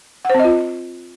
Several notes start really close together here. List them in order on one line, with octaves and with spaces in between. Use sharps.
F#5 C5 C4 D#5 F4